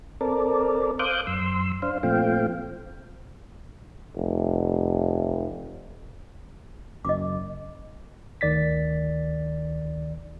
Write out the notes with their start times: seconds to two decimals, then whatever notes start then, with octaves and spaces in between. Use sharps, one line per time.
0.21 C4 A4 A#4 D5
0.99 C5 F5 D6 D#6 F#6 G6
1.27 F#2 C6 E6
1.82 D4 C5 F5
2.03 A#2 F3 A3 C4 F5 G5
4.16 F1
7.05 F#1 F#2 D#5 D6
8.41 D2 D#3 D5 A6 B6